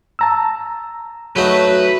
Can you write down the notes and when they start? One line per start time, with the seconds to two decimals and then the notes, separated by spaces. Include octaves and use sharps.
0.19 A5 A#5 E6
1.36 F#3 A3 D#4 B4